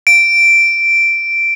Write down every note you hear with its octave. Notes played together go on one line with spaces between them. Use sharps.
D7